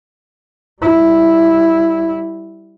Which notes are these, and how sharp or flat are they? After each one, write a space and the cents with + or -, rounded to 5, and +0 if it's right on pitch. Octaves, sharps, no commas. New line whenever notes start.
G3 -15 E4 +0